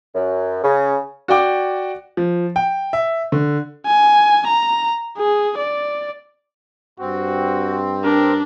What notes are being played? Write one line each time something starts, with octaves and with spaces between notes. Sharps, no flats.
F#2
C#3
F#4 D5 G5 D6
F3
G5
E5
D3
G#5
A#5
G#4
D5
G2 C4 F#4
D4 A#4